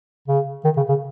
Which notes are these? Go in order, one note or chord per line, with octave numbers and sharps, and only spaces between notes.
C#3
D#3
C#3
C#3